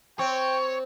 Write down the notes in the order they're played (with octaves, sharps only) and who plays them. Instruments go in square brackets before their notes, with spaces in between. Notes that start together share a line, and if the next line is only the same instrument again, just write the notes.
[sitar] C4 [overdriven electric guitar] C#5 [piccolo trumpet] G5